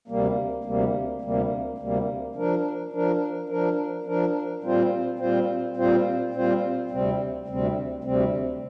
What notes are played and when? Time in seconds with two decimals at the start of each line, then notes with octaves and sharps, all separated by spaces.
0.08 D2 C3 G3 A#3
0.64 D2 C3 G3 A#3
1.22 D2 C3 G3 A#3
1.78 D2 C3 G3 A#3
2.35 F3 D4 A#4
2.92 F3 D4 A#4
3.49 F3 D4 A#4
4.06 F3 D4 A#4
4.63 A#2 G3 C4 F4 C5
5.19 A#2 G3 C4 F4 C5
5.77 A#2 G3 C4 F4 C5
6.33 A#2 G3 C4 F4 C5
6.90 D2 C3 G3 C4
7.48 D2 C3 G3 C4
8.04 D2 C3 G3 C4